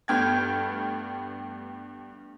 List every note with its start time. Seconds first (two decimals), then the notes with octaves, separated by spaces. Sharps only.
0.08 G2 A3 B3 G5 F6 G#6